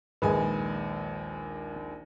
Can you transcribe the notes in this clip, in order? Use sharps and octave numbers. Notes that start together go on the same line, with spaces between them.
A#1 D#2 G#3 G#4 B4 G#5